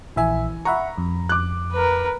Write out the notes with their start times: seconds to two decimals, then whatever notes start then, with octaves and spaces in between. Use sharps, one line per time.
0.16 A#1 E3 E5 G#5
0.65 E5 F#5 A#5 B5 C#6
0.98 F2
1.29 D6 F#6
1.72 A#4 B4